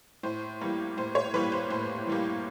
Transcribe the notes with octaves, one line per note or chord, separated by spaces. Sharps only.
A2 C5
E3 G3 A#3
A2 C5
C#5
E3 G3 A#3 B4
C5
A2 C5
E3 G3 A#3